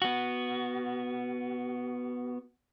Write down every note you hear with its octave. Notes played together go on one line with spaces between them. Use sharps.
B3 F#4